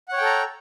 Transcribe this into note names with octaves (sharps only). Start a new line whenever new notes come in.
A4 C#5 F#5 G5 A#5